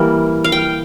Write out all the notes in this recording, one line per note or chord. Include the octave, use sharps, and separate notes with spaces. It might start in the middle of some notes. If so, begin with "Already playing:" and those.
Already playing: E3 G3 A#3
F5
G5